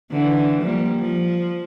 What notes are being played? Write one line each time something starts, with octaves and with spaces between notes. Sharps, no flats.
D3 E3
F3 G3 A#3
F3